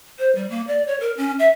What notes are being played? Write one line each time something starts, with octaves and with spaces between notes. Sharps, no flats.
C5
G3
A#3
D5
C#5
A#4
C#4
E5